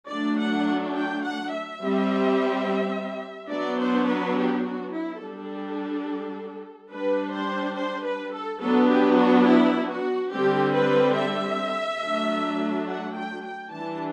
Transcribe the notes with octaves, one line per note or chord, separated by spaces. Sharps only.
F#3 A3 D4 D5
F#5
G5
F#5
E5
G3 C4
F#3 B3 D4 D5
C5
B4
G4
F#4
E4
G3 D4 A4
G3 D4 B4
C5
C5
B4
A4
F#3 B3 D4 A4
G4
F#4
E4
F#4
D3 G3 C4 G4
B4
E5
F#3 A3 D4
F#5
G5
G5
E3 G3 D4 A5